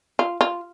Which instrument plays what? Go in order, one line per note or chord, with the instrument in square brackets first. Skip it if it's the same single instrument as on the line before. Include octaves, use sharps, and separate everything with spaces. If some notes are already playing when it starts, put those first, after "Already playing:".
[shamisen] F4
F4